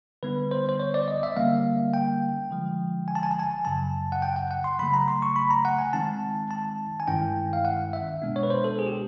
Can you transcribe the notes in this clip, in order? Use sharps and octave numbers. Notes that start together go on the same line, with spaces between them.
D3 G3 B3 D#4 B4
C5
C5
C#5
D5
D#5
E5
D3 G3 A#3 C#4 F5
G5
D3 F3 G#3
G#5
A5
G#5
A5
G#5
F#2 C#3 F#3 A5
F#5
G5
F#5
F#5
C6
C#3 F#3 A3 B5
A#5
C6
C#6
B5
A#5
F#5
G#5
D#3 G#3 C4 D#4 A5
A5
G#5
G2 D#3 G#3 C#4 E4 G5
F5
F#5
E5
B2 G#3 B3 D4
C#5
B4
C5
A4
G#4
G4